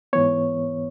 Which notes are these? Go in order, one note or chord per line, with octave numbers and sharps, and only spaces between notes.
G#2 E3 B3 C#5